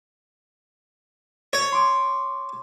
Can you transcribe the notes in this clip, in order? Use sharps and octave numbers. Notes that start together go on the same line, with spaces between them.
C#5
C6 D6